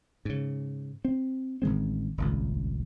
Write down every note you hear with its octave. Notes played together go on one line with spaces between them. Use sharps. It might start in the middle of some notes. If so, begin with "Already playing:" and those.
G#2 C#3
C4
A1 D#3 G#3 C4
D#1 G#1 C#2